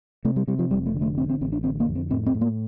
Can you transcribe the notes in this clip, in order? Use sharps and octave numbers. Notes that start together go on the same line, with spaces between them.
C3 A3
G3
C3 G3
F3
F1 G3
A3
D3
A3
A1 C4
C4
A1 C4
D4
D3 C4
A#3
F2
C4
A2 C4
C4
A2
A#3